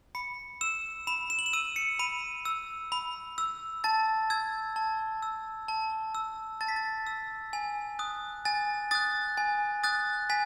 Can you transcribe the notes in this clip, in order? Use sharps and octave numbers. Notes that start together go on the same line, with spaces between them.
B5 C#7
E6 E7
B5 E7
E7
F#7
E7
E6 D#7
C#7
B5 D#7
E6
B5
E6
A5 A6
E6 G#6
A5
E6
A5
E6
A5 A6
B6
A6
E6
G#5
D#6 F#6
G#5 A6
D#6 F#6 A6
G#5
D#6 F#6 A6
G#5 B6